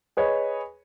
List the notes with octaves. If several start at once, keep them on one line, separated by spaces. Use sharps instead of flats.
G#4 B4 C#5 D#5